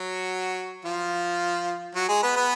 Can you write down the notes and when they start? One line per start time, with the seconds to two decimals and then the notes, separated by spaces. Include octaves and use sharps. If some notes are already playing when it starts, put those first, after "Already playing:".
Already playing: F#3 F#4
0.85 F3 F4
1.95 F#3 F#4
2.08 G#3 G#4
2.23 B3 B4
2.36 B3 B4